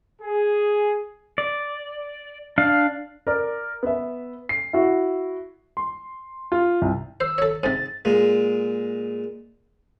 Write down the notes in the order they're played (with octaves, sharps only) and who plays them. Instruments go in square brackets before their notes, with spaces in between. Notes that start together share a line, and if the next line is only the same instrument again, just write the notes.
[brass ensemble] G#4
[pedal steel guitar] D5
D4 F5
[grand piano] A#4 D5
B3 E5
C7
E4 F#4
[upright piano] C6
F4
C2
[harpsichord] C5 [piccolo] E6
[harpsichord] A4 C#5
[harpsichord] G#2 C3 [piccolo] A6
[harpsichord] A#2 G#3